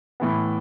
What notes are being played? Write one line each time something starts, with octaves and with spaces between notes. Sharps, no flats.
A2 E3 B3